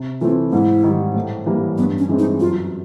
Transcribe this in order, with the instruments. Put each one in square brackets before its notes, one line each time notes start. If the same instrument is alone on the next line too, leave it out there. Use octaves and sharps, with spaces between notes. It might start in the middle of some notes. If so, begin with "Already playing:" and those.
Already playing: [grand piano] C3
[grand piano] E3 A3 C4 E4 [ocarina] F4
[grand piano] G#2 [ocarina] E4
[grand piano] D#3 G3
A2
E3 G3 A#3
[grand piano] G2 [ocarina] B3
[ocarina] C#4
[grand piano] E3 G#3 C4
[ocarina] D#4
[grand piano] F#2 [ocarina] F4